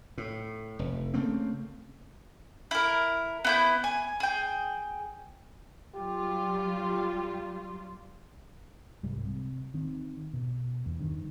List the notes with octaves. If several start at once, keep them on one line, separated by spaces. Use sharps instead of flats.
A2
F1
C#3 A3 A#3 C4
E4 A#4
B3 E4 G6
G#5
G#4 G5
F#3 G3 F4 G4
C2 G#2 G3
C3
D#3 C4
B2
E2
G2 D#3